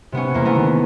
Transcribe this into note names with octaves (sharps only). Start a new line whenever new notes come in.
C3 B3 C#4
E2 A#3
A3 B3
D#3